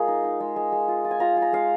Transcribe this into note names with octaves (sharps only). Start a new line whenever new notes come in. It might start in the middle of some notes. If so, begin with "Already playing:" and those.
Already playing: G#3 F4 G#4 A#4
D#4
D#4
G#3
G#3
G#3
F4
F4
G#5
F4 A#5
F4
A#5
G#3 F5